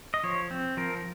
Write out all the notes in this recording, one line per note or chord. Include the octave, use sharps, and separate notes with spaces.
D#5
F3 C#5
C4
F3 A#4